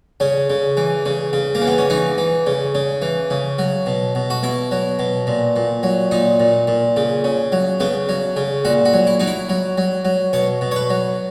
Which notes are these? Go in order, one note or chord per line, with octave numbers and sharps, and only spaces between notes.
C#3 C#4
C#3
E3
C#3
C#3
A#3
E3
B3
C#4
E3 D#4
E3
C#3
C#3
E3
C#3
F#3
B2
B2
F#4
B2 E4
F#3
B2
A#2
A#2
F#3
A#2 D#4
A#2
A#2
C#3
C#3
F#3
C#3 B3
F#3
C#3
A#2 F#4
F#4
F#3
E4
F#3 D#4
E4
F#3
F#3
F#3
B2 C#5
B2
C#5
B4
F#3